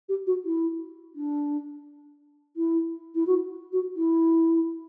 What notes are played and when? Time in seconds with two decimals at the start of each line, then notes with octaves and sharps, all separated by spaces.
0.09 G4
0.27 F#4
0.45 E4
1.15 D4
2.56 E4
3.15 E4
3.27 F#4
3.73 F#4
3.96 E4